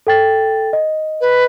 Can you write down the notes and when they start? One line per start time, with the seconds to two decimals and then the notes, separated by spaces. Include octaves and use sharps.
0.07 A4 G5 A6
0.73 D#5
1.21 B4